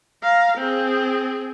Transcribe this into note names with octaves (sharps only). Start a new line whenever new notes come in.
F5 A#5
C4 G#4